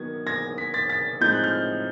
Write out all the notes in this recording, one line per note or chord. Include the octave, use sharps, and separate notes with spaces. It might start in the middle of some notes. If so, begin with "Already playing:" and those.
Already playing: D#3 F#3 B3 G#6
G#6 A#6
B6
A6 B6
A6 B6
A2 F3 G#3 C4 D#4 G6
F#6
F6 G6